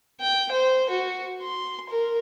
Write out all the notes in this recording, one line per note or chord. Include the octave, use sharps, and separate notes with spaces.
G5
C5
F#4
C6
A#4